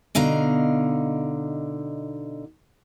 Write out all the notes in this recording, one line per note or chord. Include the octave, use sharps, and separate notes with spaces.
B2 D3 D#4 F5 A#5